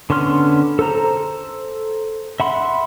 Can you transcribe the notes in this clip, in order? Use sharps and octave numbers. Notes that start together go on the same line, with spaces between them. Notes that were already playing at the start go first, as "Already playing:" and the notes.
D3 B3 C#4 C6 F6
A4 C5 A#5
E5 F#5 B5 C6